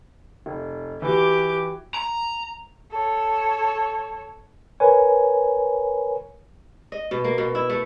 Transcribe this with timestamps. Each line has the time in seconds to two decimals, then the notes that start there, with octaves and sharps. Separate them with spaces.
0.46 F1
1.02 E3 F#4 G4 D6
1.94 A#5
2.91 A4 C#5
4.80 A#4 B4 C#5 G#5
6.92 D#5
7.11 B2
7.24 A#3
7.38 B2
7.55 E4
7.70 A3